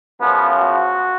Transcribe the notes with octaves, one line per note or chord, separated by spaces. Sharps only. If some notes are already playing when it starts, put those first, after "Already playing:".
F#2 C#3 F3 B3
F#4